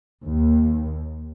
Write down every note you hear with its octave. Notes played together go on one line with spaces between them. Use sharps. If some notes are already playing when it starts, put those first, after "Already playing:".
D#2